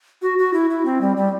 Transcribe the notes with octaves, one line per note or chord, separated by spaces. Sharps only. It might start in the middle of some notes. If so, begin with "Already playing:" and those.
F#4
F#4
E4
E4
C4
G3
G3